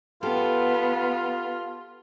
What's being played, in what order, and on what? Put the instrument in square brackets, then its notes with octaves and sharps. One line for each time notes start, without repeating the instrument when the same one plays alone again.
[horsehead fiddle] B3 [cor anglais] F4 [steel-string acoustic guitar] G4 A4